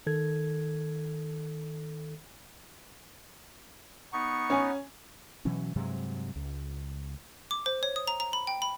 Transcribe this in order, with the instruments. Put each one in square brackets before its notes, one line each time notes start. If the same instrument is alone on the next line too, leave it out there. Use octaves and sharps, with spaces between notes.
[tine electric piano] D#3 A4 G#6
[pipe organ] B3 D#4 [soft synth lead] C#6
[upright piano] C#4 G#5
[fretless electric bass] B2 E3 F#3 C#4
G2 C3 F#3 G#3
C#2
[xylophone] D6
C5
C#5
D#6
A#5
A#5
B5
G5
B5